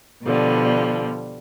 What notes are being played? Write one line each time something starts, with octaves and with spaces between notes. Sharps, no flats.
B2 D3 F3 G3